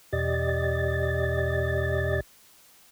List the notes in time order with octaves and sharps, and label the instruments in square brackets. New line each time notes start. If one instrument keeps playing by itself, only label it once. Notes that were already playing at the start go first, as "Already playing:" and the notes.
[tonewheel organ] E2 B2 G4 D5 D#5 A6